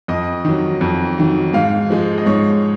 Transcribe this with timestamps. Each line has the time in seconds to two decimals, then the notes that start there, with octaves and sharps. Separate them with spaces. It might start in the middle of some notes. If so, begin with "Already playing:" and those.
0.08 F2 D#5
0.45 D#3 F#3
0.81 F2
1.18 D#3 F#3
1.54 G#2 F5
1.90 F3 G#3
2.18 D#5
2.26 G#2 C#5